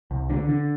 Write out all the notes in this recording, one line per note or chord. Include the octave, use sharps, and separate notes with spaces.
C2
D3
D3